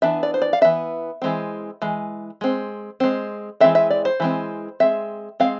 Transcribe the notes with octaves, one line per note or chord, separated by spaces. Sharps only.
E3 B3 D4 E5
D5
C5
D5
F5
E3 B3 D4 E5
E3 G#3 C4
E3 G#3
G#3 C4
G#3 C4
E3 G#3 C4 E5
E5
D5
C5
E3 G#3 C4
G#3 C4 E5
G#3 C4 F5